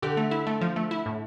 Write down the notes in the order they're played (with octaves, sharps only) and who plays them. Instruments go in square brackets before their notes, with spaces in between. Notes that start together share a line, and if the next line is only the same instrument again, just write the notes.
[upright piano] D3 [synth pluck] G4
[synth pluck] A3
E4
A3
F3
A3
E4
A2